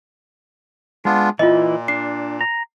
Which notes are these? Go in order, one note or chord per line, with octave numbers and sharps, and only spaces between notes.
G#3 B3 D4 F4
A#2 E3 E4 F4 D#5
D4 C7
A#5